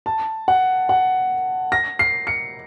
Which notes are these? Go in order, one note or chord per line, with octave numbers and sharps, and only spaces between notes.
A5
F#5
F#5
A#6
C7
C#7